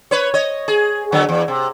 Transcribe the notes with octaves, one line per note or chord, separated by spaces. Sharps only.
B4 C#5
C#5 D#5
G#4
D3 F#3 B3
E2
C3